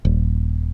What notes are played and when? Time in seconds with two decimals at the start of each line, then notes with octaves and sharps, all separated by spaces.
0.05 D#1